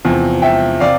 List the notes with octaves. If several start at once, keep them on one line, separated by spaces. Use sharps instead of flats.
E2 C3 F3
E5 G5
C3 D5 F5